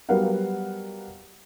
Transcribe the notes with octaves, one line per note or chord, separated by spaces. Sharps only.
F#3 G3 B3 A#4 F5 F#5